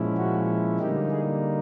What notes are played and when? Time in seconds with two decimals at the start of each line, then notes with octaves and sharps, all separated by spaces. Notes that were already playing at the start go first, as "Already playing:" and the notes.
Already playing: A#2 F3 G#3 C#4 E4
0.17 F#4
0.79 D3 G3 A#3 D#4 G4
1.11 G#4